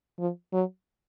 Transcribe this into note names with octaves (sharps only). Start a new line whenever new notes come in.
F3
F#3